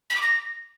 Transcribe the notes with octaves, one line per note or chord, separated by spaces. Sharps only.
B6
D6
A#6